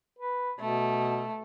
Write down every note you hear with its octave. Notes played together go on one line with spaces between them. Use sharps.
B4
B2 A3